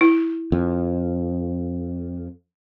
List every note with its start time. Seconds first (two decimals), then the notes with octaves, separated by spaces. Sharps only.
0.01 E4
0.52 F2